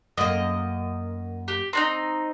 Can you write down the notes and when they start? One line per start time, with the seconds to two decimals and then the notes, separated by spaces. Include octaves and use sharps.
0.17 F#2 A#3 D#5
1.48 G4
1.73 C4 D4 D#4